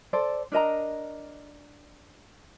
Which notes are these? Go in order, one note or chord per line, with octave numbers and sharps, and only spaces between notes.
A4 C5 D5
D4 A#4 D#5 A#5